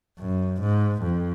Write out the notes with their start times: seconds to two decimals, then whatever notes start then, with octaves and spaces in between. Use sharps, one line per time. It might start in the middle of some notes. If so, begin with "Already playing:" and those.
0.19 F#2
0.61 G#2
1.02 F2